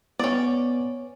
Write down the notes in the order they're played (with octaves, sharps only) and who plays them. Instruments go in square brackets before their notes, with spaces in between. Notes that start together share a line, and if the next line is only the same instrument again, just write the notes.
[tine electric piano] B3 [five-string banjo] C#4 D5